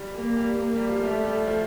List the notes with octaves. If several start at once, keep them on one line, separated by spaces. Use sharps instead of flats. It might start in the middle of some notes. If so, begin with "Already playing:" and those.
Already playing: G3 G4
G3 A#3 G4
G3 G4
A#3
G3 G4
F3 F4
G3 A3 G4
G3 G4
F3 F4